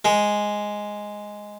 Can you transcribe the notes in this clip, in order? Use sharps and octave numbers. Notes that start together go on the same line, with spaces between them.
G#3